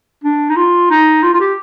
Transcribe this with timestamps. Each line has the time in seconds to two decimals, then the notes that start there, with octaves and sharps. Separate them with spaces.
0.24 D4
0.50 D#4
0.56 F4
0.90 D#4
1.23 F4
1.34 F4
1.40 G4